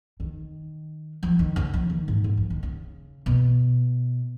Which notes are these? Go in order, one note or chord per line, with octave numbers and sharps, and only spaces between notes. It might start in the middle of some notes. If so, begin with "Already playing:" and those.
D#3
F3
D#3
C#3
F3
D#3
G#2
G#2
F3
D#3
C#3
B2